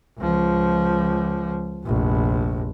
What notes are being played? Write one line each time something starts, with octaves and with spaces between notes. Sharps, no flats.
C#2 F3
F1 A#1